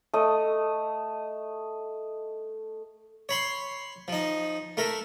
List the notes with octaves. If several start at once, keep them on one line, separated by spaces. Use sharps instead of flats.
A3 D#5
C#5 B5 C6
F3 D#4
A3 A#4 E5